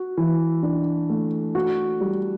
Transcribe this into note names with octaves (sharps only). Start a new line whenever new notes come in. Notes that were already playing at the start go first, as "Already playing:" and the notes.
Already playing: F#4
E3
D4
A3
F#4
G3